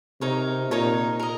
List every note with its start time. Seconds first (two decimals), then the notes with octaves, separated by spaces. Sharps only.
0.21 C3 D#4 A#4 C#5
0.70 A#2 D#4 A#4 C#5
1.20 A#4 D#5